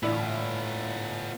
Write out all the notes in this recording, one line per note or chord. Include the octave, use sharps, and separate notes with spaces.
A2 E3 B3 D4 E4 F4